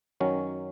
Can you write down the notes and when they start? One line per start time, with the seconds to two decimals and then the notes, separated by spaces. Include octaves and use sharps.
0.20 F#2 D#3 F#3 C#4